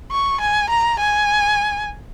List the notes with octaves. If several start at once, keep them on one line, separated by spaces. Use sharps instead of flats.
C#6
G#5
A#5
G#5